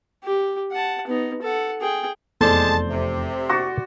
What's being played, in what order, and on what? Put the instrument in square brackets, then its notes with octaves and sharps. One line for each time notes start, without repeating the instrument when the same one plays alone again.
[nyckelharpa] G4
F#5 A5
B3 D#4
A4 F#5
G#4 G5
[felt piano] F1 E2 [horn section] G#3 A5 [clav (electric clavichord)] A4 [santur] C5 D5
[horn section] C3
[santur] F#4 [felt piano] C#6 D6 A6